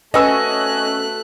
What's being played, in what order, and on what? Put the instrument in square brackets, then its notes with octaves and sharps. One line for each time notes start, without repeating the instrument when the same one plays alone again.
[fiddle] A3 F#6 [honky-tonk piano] C#4 [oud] F#4 B4 [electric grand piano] D#5 G#5 E6